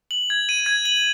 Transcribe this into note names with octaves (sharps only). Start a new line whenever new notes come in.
F#7
G#6
D#7
G#6
F#7